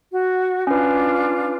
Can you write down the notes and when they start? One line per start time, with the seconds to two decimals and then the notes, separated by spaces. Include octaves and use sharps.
0.11 F#4
0.67 C#4 D4 F4 B4